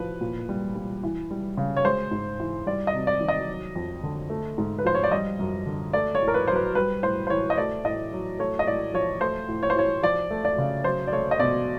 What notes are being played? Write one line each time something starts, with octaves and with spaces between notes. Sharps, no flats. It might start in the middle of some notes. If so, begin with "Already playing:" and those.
Already playing: A2 F3 B4
A#2
G3
G3
E3
G3
C#3
C#5
G#3 C5
G#2
E3
G3 D5
D#5
C3
D5
D#3
D#5
F#3
F2
D3
A3
G#2
B4
F3 C5
C#5
D5
G3 D#5
F#2
D3
A3 D5
C#5
A2
A#4
B4
F#3 C5
B4
G3 B4
A2 C5
C5
E3 C#5
D#5
A3 D5
A2 D#5
F#3
A3 C#5
D#5
A2 D5
F3 C#5
A3 C5
A2
C#5
C5
E3 C#5
F3 D5
A3
D5
C#3
F#3 C5
D5
A3 C#5
D#5
B2 D5